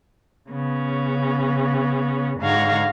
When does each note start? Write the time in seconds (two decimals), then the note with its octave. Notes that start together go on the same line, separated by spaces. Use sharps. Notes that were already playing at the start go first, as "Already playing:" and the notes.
0.50 C#3 B3 C#4
2.40 G#2 D3 F#4 F5 A#5 G#6